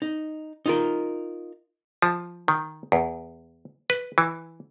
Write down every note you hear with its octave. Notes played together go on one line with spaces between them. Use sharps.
D#4
D#4 F4 A#4
F3
D#3
E2
B4
E3